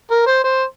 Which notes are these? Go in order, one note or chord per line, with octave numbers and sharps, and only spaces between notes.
A#4
C5
C5